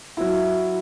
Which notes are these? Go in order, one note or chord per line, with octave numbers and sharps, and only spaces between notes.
F#3 E4